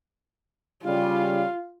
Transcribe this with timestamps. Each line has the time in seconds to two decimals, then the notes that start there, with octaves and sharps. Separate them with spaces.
0.85 C#3 G3 F4 F5